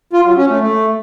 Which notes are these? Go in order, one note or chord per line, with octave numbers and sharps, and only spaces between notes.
F4
F#3
C#4
A3
A3